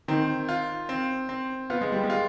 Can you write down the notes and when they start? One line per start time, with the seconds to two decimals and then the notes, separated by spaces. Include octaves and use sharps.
0.08 D#3 C4
0.49 F4
0.89 C4
1.29 C4
1.70 B3 F4
1.81 G#3
1.92 G3
2.04 G#3
2.10 F4